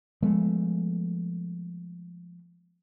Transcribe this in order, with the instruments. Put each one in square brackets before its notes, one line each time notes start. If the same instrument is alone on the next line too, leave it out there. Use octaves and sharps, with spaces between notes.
[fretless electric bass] F3 G#3 A3 B3